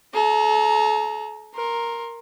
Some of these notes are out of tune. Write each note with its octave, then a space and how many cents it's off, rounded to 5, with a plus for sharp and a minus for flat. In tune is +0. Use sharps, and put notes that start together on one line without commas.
A4 -40 A#5 +0
A#4 +0 C6 +20